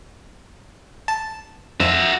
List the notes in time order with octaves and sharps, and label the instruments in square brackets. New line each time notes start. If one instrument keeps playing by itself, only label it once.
[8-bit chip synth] A5
[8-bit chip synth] F2 [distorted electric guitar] F#4 E5